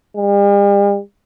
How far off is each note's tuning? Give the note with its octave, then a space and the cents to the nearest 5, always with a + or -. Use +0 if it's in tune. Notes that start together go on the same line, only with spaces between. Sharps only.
G3 +45